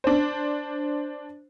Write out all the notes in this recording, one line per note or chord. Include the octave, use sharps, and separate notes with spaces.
D4 C5